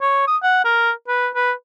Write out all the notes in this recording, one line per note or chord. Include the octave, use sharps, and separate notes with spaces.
C#5
D#6
F#5
A#4
B4
B4